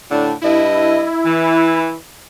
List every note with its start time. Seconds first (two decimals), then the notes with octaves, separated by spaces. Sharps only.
0.09 A2 D3 D4
0.42 G2 E4 D#5
1.24 E3